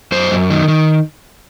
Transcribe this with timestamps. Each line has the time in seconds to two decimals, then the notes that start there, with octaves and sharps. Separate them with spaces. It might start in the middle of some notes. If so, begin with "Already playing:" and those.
0.12 F#2 C5
0.31 F#2
0.50 D#3
0.68 D#3